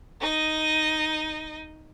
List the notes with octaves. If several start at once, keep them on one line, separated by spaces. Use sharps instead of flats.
D#4 D#5